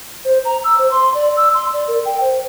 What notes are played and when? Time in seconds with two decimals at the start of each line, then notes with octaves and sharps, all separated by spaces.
0.25 C5
0.45 A#5
0.64 E6
0.78 C5
0.91 C6
1.14 D5
1.37 E6
1.54 C6
1.73 D5
1.88 A#4
2.05 G5
2.21 C5